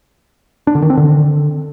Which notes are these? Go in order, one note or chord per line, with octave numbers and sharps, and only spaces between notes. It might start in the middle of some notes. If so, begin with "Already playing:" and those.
D4
D3
D#3
C4
D3